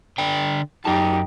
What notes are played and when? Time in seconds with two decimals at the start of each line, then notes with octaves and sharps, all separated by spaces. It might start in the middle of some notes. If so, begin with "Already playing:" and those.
0.18 D3 D5 G5
0.85 F#2 D#4 G4 A5